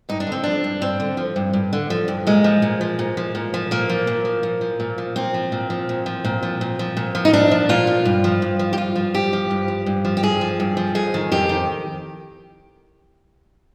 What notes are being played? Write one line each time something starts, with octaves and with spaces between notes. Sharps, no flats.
G2 D#4
D4
D3 C4
F3 D4
G2
G2 C4
D3
F3
G2
G2
D3
F3
G2
A#2 G#3
F3
A#2
F3
A#2
F3
A#2
F3
A#2 A#3
F3
A#2
F3
A#2
F3
A#2
F3
A#2 C4
F3
A#2
F3
A#2
F3
A#2
F3
A#2
F3
A#2
F3
D#4
A#2 D4
F3
A#2 F4
F3
G2
F3
G2
F3
G4
G2 F4
F3
G2 G4
F3
G2
F3
G2
F3
G4
G2 G#4
F3
G2
F3
F2 G#4
D#3
F2 G4
D#3